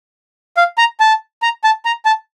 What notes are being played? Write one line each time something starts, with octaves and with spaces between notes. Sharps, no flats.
F5
A#5
A5
A#5
A5
A#5
A5